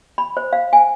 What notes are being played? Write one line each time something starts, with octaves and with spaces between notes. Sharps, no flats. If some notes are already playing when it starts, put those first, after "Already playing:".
B5
C5
F5
G#5